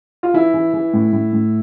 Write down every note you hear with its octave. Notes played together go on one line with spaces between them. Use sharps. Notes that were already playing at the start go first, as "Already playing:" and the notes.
F4
E3 E4
E3
E3
A2
A2
A2